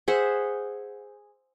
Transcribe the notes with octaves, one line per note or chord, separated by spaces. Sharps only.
G#4 C5 E5 F#5